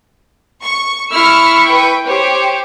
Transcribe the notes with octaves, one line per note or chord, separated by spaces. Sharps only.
C#6
E4 C#6 E6 F6
B4 G5
G4 C5 C#5